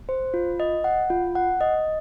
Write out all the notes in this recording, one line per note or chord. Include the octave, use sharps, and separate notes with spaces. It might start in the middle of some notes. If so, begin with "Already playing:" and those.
C5
F4
D#5
F#5
F4
F#5
D#5